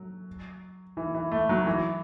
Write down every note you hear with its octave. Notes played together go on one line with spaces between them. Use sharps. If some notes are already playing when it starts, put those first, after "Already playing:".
Already playing: F#3
E3
E3
A3
F#3
E3